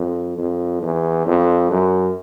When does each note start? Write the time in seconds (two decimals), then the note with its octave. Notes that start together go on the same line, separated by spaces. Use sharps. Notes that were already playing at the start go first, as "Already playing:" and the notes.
Already playing: F2
0.38 F2
0.82 E2
1.26 F2
1.71 F#2